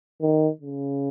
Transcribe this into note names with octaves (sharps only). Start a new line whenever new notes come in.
D#3
C#3